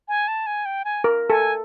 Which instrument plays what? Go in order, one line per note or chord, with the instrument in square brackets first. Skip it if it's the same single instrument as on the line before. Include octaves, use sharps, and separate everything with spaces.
[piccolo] G#5
A5
G#5
G5
G#5
[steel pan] A#4
[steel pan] A4 [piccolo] G#5